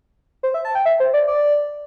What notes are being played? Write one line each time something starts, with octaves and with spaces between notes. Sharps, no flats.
C5
E5
A5
G5
E5
C5
D5
D5